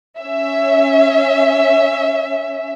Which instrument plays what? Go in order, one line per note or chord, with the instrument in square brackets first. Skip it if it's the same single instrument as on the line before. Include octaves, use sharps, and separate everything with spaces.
[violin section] C#4 E5